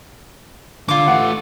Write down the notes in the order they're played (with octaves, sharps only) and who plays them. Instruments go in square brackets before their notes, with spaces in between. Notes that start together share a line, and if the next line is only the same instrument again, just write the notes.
[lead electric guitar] D3 [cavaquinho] F4 D6
[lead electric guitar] E3 A3 [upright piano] F#5